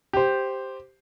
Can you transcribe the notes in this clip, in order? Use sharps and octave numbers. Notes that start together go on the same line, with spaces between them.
G4 C5